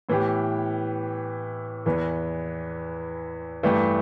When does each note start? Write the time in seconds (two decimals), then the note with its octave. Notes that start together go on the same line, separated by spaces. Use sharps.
0.09 A2 E3 B3 G4
1.86 E2 E3 B3
3.63 G2 E3 A3 G4